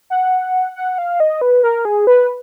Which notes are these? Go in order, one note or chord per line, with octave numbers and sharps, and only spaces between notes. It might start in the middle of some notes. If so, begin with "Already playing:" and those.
F#5
F#5
F5
D#5
B4
A#4
G#4
B4